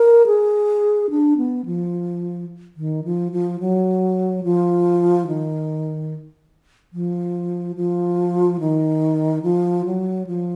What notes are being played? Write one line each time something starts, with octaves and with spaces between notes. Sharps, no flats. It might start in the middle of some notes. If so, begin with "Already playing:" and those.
Already playing: A#4
G#4
D4
B3
F3
D#3
F3
F3
F#3
F3
D#3
F3
F3
D#3
F3
F#3
F3